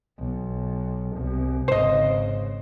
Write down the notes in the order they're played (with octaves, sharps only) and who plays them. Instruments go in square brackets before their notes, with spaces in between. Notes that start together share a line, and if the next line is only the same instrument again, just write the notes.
[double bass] B1
C2
[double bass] G#1 C#3 [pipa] C5 D#5